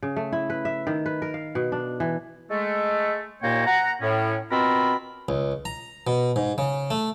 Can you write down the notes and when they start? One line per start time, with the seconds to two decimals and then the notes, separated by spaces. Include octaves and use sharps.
0.03 C#3
0.16 A3
0.33 E4
0.50 B4
0.65 E5
0.87 D#3
1.06 B4
1.22 A#4
1.34 F5
1.55 B2
1.72 D4
2.00 E3
2.50 G#3 A3
3.43 D#2 A#2 A#3 C#5 G5 A#5
3.66 F#5 A#5
4.01 A2 C#4
4.51 B2 C4 F4 A#4 B5
5.29 C#2
5.65 A#5
6.07 B2
6.36 G#2
6.58 C#3
6.91 A3